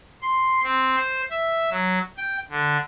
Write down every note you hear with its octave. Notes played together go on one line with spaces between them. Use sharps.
C6
C4
C5
E5
F#3
G5
D3